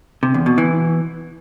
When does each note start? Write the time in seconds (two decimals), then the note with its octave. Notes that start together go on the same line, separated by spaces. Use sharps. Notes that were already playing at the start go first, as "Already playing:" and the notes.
0.23 C3
0.34 E2
0.46 B2
0.58 E3